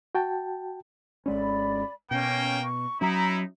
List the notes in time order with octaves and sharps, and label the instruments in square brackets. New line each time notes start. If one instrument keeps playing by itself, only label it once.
[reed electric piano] F#4 G5 A5
[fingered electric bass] G#1 G#3 C#4 [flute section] D5 B5
[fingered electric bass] B2 [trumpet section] A#3 G5 [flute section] C#4
[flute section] C#6
[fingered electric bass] F#3 C#4 [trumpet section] D#4 E4 [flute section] A#5